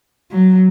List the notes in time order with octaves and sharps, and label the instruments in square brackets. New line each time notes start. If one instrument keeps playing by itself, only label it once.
[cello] F#3